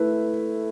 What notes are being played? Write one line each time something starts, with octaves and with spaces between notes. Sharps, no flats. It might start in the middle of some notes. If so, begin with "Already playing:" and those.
Already playing: A3 E4 B4